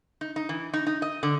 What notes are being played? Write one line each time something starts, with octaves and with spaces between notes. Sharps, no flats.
D#4
D#4
E3
D#4
D#4
D#5
D3